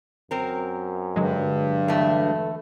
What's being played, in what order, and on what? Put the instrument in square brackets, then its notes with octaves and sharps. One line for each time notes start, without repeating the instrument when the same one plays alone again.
[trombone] F#2 [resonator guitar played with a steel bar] C4 A#4
[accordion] G2 [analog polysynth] D3 F#3 G#3
[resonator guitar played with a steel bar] E2 A3 [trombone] A4